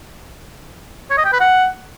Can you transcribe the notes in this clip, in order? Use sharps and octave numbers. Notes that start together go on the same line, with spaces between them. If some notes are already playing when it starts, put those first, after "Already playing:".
C#5
D#5
G5
B4
F#5